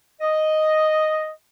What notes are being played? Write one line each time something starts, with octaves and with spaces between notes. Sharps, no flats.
D#5